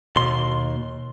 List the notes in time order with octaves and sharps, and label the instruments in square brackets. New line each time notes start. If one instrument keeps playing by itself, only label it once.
[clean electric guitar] D#2 C6 [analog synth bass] B2